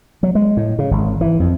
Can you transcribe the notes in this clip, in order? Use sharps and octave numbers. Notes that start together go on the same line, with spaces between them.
F#3
G#3
A2
C#3
G#1
E3
F2